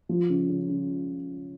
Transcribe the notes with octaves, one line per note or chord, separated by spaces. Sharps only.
F3
C#3
C#3
C#3